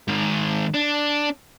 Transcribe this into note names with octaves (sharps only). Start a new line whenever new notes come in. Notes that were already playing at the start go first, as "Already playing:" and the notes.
G#2 D#3
D4